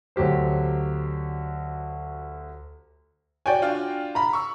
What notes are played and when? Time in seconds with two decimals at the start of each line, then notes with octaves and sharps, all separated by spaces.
0.16 D2 F#3 G4 C5
3.46 F#4 C#5 D5 G5 G#5
3.62 D4 F4 F#4
4.15 A#5 B5
4.33 C#6 E6